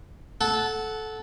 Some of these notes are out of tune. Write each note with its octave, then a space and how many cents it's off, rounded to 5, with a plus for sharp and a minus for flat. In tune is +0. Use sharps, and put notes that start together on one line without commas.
A4 -15 F#5 +0